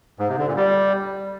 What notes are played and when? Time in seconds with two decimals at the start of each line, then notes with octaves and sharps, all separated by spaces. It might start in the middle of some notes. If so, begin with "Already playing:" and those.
0.19 G#2
0.29 C3
0.38 D3
0.47 A#2
0.57 G3